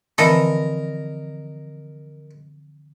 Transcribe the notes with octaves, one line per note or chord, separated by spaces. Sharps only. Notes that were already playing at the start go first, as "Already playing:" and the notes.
D3 E3 F3 C4 A4 A#4 D#5